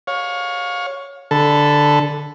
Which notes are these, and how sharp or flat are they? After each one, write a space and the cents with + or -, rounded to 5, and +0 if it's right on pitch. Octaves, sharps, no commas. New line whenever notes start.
C#5 +0 F5 +30
D3 +0 A4 +0 B5 +0